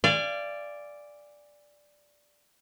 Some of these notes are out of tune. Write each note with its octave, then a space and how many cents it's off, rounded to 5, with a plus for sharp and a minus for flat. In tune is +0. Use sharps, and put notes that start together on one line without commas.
D5 +0 F5 -30 G#5 -25